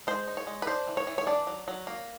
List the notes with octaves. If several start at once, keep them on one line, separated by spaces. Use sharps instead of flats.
G#3 C5
D#4
C#5
G#3
B4
D4 C5
E3
C#5
E3
C#5
D4 D5
F#3
F#3
A#3